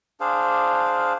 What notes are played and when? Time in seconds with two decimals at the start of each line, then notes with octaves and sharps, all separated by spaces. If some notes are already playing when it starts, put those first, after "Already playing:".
0.20 D4 G#4 C5 F5